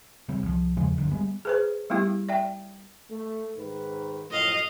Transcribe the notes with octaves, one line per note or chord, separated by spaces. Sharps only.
C3 F#3 G3 C4
C2 F3
E2 C#3 F3 G#3
G1 D2 D3 F#3
G3 G#3 B3
G#4 B4 C5
G3 A3 B3 E4 G4
D5 E5 G5
A3
G#2 D#3 B4
F#2 A2 F3 D#5 F5